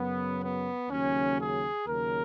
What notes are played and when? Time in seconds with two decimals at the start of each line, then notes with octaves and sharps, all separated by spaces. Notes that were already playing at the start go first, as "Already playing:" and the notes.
Already playing: F#2 C#3 F#3 B3
0.40 B3
0.88 D#2 C#3 F#3 C#4
1.38 G#4
1.86 D#2 C#3 F#3 A#4